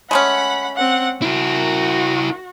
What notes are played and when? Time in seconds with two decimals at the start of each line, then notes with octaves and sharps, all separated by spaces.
0.11 G#3 A3 C#4 F#5 B5
0.76 C4 F#5
1.22 E4 F#4 A#4